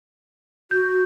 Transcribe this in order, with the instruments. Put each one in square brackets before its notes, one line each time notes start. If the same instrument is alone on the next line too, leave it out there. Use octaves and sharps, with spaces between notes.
[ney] F#4 [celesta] G6